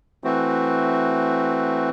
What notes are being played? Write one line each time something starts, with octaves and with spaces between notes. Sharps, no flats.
E3 A3 C4 F#4